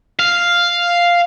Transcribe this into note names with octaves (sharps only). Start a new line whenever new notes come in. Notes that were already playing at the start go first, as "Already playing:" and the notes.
F5